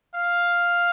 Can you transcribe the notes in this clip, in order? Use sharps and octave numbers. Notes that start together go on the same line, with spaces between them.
F5